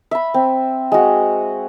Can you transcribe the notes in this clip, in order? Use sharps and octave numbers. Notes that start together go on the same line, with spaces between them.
E5 B5
C4
G#3 F#4